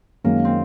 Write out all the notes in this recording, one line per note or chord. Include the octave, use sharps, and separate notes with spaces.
F#2 D#3 G#3 A#3 C#4
C4